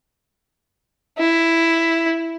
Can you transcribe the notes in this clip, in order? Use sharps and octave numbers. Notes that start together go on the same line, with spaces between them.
E4